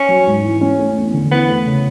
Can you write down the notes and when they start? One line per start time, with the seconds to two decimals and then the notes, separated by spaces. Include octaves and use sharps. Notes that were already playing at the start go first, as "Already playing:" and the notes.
Already playing: C#4
0.09 F#3
0.26 G#2
0.44 E3
0.61 C#4
0.78 A3
0.96 E2
1.14 D3
1.31 E2 B3
1.48 A3
1.66 C#3